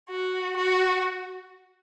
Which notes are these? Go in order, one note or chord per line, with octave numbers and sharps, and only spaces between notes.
F#4
F#4